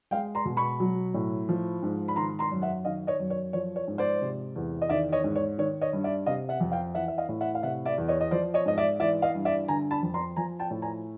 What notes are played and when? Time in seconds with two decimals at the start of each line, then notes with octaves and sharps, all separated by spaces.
0.11 G#3 F5 G5
0.35 A#5 C6
0.45 B2
0.57 B5 C#6
0.80 F#3
1.14 A2
1.49 F3
1.83 G#2
2.08 B5
2.16 D#3 A#5 C6
2.39 A#5 C6
2.51 F#2
2.62 E5 F#5
2.85 D#3 D#5 F5
3.07 C#5 D#5
3.20 F#2
3.30 C#5
3.53 F3 C#5
3.76 C#5
3.88 G#2
3.98 C5 D5
4.21 C3
4.56 E2
4.82 D#5
4.89 D#3 D5 E5
5.12 C#5 D#5
5.24 G#2
5.36 C#5
5.58 D#3 C#5
5.81 C#5 D#5
5.93 G2
6.04 D5 E5
6.26 C3 D#5 F5
6.49 E5 F#5
6.60 F2
6.72 F5 G5
6.95 E3 E5 F#5
7.08 E5
7.18 D#5 F5
7.29 A2
7.41 E5 F#5
7.55 F5
7.63 C3 E5 F#5
7.85 D5 E5
7.98 E2
8.08 C#5 D#5
8.21 D#5
8.31 F3 C5 D5
8.54 C#5 D#5
8.66 G#2 D#5
8.78 D5 E5
9.00 E3 D5 E5
9.22 D#5 F5
9.35 G2
9.45 D5 E5
9.68 D3 G#5 A#5
9.91 A5 B5
10.02 F2
10.14 A#5 C6
10.36 F3 G#5 A#5
10.60 G5 A5
10.71 A2
10.82 G#5 A#5